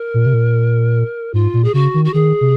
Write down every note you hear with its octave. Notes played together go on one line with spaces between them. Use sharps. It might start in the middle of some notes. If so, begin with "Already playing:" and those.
Already playing: A#4
A#2
C3
A#2
G#2 F4
A#2
G#4
C#3 F#4
D#3
F#4
D#3 G#4
C3